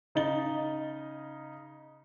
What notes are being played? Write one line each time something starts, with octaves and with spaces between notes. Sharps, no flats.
C#3 D#4 D#5 A6 G7